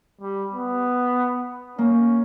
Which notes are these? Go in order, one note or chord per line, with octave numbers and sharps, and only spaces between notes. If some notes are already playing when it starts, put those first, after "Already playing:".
G3
B3
A#3 C#4